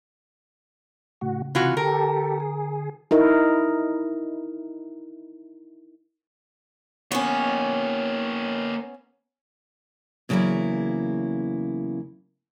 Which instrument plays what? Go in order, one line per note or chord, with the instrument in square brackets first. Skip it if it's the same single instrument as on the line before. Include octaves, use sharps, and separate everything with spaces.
[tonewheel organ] A2 F#4 [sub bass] C#3
[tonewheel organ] C3 [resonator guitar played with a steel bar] E3 F4 F#4
[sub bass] D3 [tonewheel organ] G4 A4 [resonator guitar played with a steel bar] A#4
[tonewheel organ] G#4
[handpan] D#4 E4 A#4
[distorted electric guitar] A#3 C#5 [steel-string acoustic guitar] B3 C#4
[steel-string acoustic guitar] E2 C#3 F#3 G3 A#3 E4